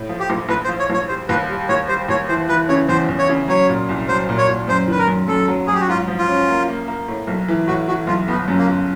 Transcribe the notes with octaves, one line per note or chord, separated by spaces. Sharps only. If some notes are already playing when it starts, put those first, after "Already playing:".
Already playing: A2
F3
G4
A#1
A#1 B4
C5
F3
C#5
A#1 C#5
G3 C5
D#2 B4
G3
D#2 C#5
G3 C5
D#2 C#5
E3 C5
E3 B4
C#3 C#5
E2 C5
E2
C#5
C#3
F#3 C#5
A#2
C2
F#3 C5
A#2
C#5
A#2
F#2 C5
D#3 B4
A#4
F#2
F#2 A4
F#3
F#3 G#4
G4
F#4
G#2 F4
F3
F4
C#4
A#3
A#3
A#3
A2
B1
E3
A2 F#4
E3 F#4
B1 F4
G1 B3
F#2
A#3
G1